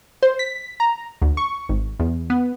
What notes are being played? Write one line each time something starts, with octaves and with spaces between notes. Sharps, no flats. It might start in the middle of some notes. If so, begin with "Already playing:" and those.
C5
B6
A#5
D2
C#6
G#1
E2
B3